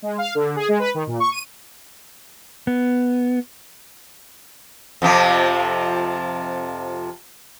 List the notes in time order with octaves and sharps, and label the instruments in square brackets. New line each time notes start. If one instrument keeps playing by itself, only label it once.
[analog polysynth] G#3
F5
D3
G#4
G#3
B4
D#3
A#2
C#6
D#7
[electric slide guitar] B3
[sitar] F2 C3 F3